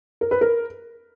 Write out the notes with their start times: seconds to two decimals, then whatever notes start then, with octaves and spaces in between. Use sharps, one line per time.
0.21 A#4
0.31 B4
0.41 A#4